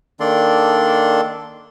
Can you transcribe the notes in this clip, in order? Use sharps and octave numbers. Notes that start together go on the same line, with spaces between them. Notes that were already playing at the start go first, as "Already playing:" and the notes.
D#3 A#3 D4 A4 D5 C6